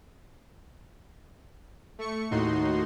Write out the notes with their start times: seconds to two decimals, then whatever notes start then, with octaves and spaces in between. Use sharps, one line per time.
1.99 A3 C#6 C#7
2.31 D#2 A2 D#4 F#4 C6